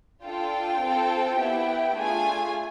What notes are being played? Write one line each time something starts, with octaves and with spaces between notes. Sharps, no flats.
D4 F4 A4 G5
C4 F4 A4
B3 E4 G4
A3 D4 F4 G#4 G#5